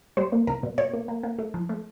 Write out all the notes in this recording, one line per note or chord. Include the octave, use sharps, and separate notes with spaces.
G3 C5
A#3
C2 A#4
B2
B2 C#5
A#3
A#3
A#3
A3
F3
A3